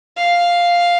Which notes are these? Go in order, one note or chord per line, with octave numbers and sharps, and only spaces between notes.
F5